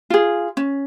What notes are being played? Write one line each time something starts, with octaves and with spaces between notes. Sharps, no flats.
F4 G#4
C#4